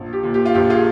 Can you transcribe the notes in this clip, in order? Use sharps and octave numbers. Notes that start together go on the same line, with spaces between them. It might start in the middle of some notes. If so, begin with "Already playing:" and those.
Already playing: A#1
G4
A#2
G4
F4
A#1 G4
F4 G#4